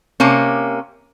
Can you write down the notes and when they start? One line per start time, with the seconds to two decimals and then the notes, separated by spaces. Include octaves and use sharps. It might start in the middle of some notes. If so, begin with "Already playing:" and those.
0.20 C3 A#3 C#4